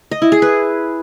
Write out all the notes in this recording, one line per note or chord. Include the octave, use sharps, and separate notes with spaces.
D#5
E4
G#4
B4